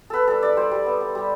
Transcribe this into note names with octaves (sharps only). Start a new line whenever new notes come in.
B3 A4 B4
G3 A4
E4 D5
G3 C5
G3
B3
B3
G3